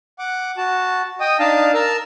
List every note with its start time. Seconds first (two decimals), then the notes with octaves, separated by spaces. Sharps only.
0.19 F#5 D6
0.57 F#4 A5
1.20 D#5 G5 D#6
1.39 D4 D#4 F5 A5
1.74 A#4 A5 E6